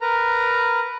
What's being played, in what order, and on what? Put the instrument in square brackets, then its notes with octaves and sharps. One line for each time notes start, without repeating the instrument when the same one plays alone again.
[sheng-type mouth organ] A#4 B4 A#5